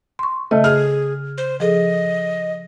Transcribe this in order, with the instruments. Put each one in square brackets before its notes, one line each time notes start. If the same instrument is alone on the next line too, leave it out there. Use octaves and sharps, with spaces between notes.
[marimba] C6 C#6
[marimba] C#3 D#5 [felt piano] A3
[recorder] G#4 [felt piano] F6
[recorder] C5
[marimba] F3 G#4 A4 [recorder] D#5